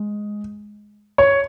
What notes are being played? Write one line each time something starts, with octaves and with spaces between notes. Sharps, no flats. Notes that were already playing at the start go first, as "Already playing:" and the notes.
Already playing: G#3
C#5